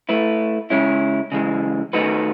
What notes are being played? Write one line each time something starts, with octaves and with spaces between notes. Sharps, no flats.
A3 E4 B4
C#3 G#3 C#4 E4
C#3 E3 G#3
D#3 A3 D#4 F#4 B4